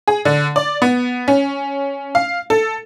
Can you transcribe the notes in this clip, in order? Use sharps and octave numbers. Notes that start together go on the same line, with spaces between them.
G#4
D3
D5
B3
C#4
F5
A4